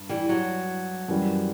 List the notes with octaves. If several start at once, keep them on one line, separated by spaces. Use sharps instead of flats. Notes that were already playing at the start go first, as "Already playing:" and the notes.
Already playing: G2
E3 G3
F#3
F#2 E3 G3